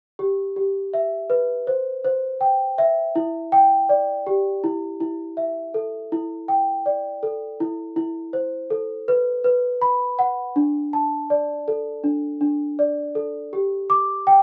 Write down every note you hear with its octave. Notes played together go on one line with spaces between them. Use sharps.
G4
G4
E5
B4
C5
C5
G5
E5
E4
G5
D5
G4
E4
E4
E5
A4
E4
G5
D5
A4
E4
E4
C5
A4
B4
B4
B5
F#5
D4
A5
D5
A4
D4
D4
D5
A4
G4
D6
G5